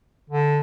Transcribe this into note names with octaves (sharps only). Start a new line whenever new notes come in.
D3